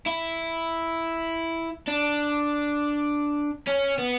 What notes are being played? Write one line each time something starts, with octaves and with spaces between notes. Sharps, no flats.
E4
D4
C#4
B3